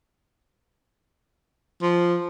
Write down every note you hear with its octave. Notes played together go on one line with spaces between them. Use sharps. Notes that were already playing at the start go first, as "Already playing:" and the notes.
F3